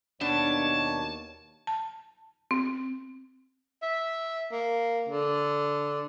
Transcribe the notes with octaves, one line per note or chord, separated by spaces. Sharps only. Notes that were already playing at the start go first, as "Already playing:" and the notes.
D#2 B2 D4 C#5 A5
A5
C4
E5
A#3
D3